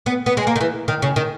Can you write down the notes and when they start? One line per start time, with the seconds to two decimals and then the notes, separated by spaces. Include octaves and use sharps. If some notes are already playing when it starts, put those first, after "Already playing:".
0.06 B3
0.26 B3
0.37 G#3
0.47 A#3
0.56 D#3
0.61 E3
0.88 D#3
1.02 C#3
1.16 D#3